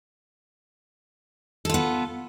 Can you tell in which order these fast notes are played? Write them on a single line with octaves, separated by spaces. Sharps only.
A4 F4 B3